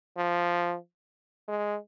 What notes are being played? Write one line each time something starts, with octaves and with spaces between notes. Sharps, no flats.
F3
G#3